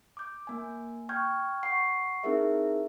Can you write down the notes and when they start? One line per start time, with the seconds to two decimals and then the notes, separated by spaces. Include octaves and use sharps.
0.17 D6 G6
0.47 A#3 G#5
1.09 G5 C#6 F6 G6 G#6
1.63 F#5 C#6 C7
2.23 C4 D#4 E4 G#4 A#4 E5